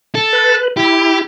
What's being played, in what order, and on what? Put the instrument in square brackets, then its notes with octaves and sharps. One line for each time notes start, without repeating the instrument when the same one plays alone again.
[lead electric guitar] A4
[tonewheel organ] B4
[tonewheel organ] E4 [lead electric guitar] G4